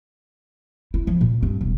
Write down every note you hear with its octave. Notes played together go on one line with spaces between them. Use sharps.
E4
F3
A#2
G2
E1